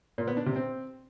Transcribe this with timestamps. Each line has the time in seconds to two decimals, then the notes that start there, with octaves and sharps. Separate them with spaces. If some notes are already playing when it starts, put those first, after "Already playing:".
0.18 A#2
0.27 B3
0.37 D4
0.46 C3
0.56 C4